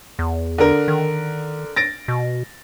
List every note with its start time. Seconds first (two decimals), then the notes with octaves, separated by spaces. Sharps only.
0.19 E2
0.58 D3 A#4
0.88 D#3
1.76 A6 A#6 D7
2.08 B2